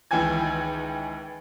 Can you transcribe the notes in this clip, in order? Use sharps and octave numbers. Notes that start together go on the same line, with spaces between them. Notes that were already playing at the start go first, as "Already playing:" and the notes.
C#2 D#3 E3 G5 G#5 G#6